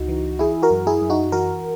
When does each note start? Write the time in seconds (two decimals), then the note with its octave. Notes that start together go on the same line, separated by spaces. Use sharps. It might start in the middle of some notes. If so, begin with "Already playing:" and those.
Already playing: C#2 D#4 F#4
0.08 E3
0.39 E3 E4 G#4
0.62 F#4 A#4
0.71 F#2
0.87 E4 G#4
1.02 F#2
1.10 D#4 F#4
1.32 E3 F#4 A#4